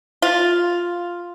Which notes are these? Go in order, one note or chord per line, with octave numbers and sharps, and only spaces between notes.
F4